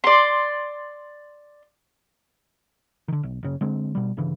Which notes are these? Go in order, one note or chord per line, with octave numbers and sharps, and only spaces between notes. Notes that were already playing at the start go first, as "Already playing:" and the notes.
D5 C6
D3 D#3
B1
F#1 C#3
D3 G#3 C4
B2 G3
G1 G2 C#3 E3